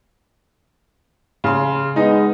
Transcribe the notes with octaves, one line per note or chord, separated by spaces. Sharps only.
C#3 C6
G#3 B3 D#4 D#5